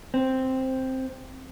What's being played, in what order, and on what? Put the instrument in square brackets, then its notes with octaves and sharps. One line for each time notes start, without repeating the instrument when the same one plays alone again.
[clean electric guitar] C4